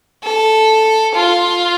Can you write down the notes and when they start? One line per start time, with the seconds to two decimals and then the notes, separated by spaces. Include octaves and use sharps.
0.24 A4
1.15 F4